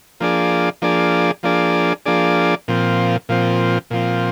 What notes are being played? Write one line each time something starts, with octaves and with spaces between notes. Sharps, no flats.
F3 A#3 D4 G#4 D5
F3 A#3 D4 G#4 D5
F3 A#3 D4 G#4 D5
F3 A#3 D4 G#4 D5
A#2 F3 C4
A#2 F3 C4
A#2 F3 C4